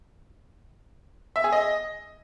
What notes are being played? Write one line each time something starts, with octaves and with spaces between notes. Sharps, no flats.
E5
G#4
D#5